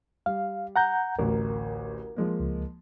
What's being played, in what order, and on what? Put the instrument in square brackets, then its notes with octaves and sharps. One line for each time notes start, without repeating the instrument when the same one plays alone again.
[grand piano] G3 [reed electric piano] F5
[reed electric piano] F#5 A#5 G6
[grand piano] A1 D2 [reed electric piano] A#4
[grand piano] F3 G#3 A#3
[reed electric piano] C#2